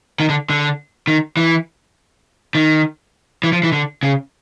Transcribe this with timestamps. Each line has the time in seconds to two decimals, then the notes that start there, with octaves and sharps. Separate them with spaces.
0.20 D#3
0.29 D3
0.50 D3
1.07 D#3
1.37 E3
2.55 D#3
3.43 E3
3.52 F3
3.63 E3
3.72 D3
4.03 C#3